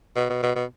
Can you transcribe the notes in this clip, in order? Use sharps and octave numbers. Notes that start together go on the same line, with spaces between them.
B2
B2
B2
B2